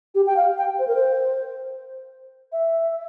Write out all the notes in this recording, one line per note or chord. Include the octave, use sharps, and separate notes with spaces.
G4
G5
F5
G5
C5
A#4
C5
E5